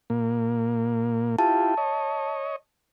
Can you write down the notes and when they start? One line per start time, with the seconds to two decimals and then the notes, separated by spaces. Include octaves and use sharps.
0.10 A#2 A#3
1.39 E4 F4 G4 A5
1.77 C#5 D#5